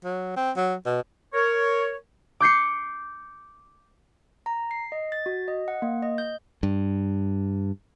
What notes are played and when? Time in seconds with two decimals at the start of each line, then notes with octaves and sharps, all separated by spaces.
0.04 F#3
0.36 C4
0.56 F#3
0.85 B2
1.33 A#4 C#5
2.40 D6 G6 C7 C#7
4.46 A#5
4.71 C7
4.92 D#5
5.12 A6
5.26 F#4
5.48 D#5
5.68 F#5
5.82 A#3
6.03 D#5
6.18 G6
6.63 G2